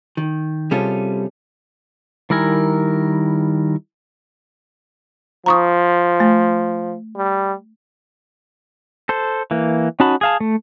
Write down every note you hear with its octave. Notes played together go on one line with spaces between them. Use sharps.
D#3
C3 G3 C#4 F4 G#4 A4
D#3 G3 E4 A#4 G#5
F3 A#5 C#6 D#6
A3
G3
A4 C5
E3 A#3
C#4 D#4 F#4 A5 B5
G#4 F5 A5
A3